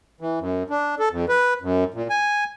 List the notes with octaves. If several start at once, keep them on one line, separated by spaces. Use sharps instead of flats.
E3
F#2
D4
A4
F2
B4
F#2
A#2
G#5